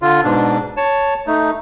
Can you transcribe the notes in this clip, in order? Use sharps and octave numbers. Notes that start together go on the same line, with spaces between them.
D3 F4
G#2 B2 D4
C#5 A5
A3 D#4